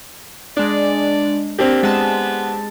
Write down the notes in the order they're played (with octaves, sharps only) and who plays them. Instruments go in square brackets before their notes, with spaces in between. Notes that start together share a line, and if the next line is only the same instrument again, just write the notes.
[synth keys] G#3 D4 [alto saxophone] D5
[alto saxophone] A#3 [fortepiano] C4 D4 G4
[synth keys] G#3 A5 [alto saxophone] B3